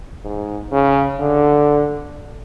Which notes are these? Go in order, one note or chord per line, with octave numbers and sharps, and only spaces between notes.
G#2
C#3
D3